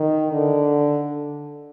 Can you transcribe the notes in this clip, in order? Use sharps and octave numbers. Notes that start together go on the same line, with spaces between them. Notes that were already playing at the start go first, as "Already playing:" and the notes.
Already playing: D#3
D3